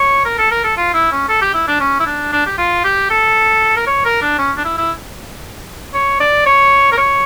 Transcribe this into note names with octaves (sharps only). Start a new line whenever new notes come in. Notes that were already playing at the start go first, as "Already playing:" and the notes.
Already playing: C#5
A#4
A4
A#4
A4
F4
E4
C#4
A4
G4
E4
D4
C#4
E4
D4
D4
G4
F4
G4
A4
A#4
C#5
A#4
D4
C#4
D4
E4
E4
C#5
D5
C#5
A#4
C#5